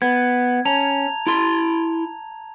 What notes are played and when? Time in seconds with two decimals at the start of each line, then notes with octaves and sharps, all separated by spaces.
0.02 B3 G#6
0.65 C#4 A5 A#5 F7
1.27 E4 C6